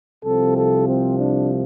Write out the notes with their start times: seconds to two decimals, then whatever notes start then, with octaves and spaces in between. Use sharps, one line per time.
0.24 C2 C3 F3 C4 A4
0.56 A4
0.87 C4
1.19 D4